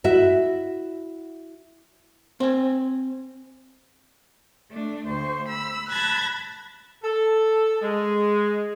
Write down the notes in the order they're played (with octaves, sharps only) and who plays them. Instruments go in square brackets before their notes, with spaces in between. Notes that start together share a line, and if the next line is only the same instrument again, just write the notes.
[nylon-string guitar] E4 F#4 E5
[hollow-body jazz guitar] C4 G#5
[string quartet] A3 D4
D2 C5 C#6
B5 E6
A5 B5 F#6 G#6 A#6
[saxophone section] A4
G#3